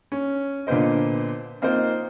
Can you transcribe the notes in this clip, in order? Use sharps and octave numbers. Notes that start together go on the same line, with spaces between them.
C#4
A#2 D3 B3 C5 D#5
A#3 C4 D#4 F4 C5